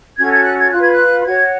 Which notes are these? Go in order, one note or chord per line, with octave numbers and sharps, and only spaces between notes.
C#4 F#4 A4 G#6
G#6
F#6
G#6
F4 B4 F#6
G#6
F#6
F#4 C#5 G#6